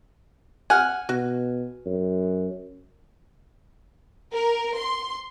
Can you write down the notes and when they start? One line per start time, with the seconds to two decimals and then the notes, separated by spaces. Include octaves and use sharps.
0.70 F#5 G#5 F6
1.09 B2 F#4
1.86 F#2
4.33 A#4
4.77 C6